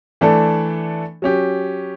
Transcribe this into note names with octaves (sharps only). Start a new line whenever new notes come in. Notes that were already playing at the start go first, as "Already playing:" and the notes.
E3 A3 D4 A4
F#3 C#4 G4